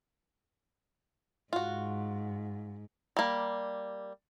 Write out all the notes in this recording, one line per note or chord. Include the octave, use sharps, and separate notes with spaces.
G#2 F4 F#4
G3 A#3